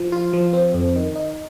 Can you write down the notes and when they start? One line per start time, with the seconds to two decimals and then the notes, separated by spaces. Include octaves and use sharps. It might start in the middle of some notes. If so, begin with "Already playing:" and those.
Already playing: F3
0.12 F4
0.33 F3
0.53 C4
0.74 F2
0.96 D#3
1.15 D#4